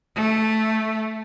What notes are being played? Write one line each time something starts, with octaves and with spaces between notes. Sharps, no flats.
A3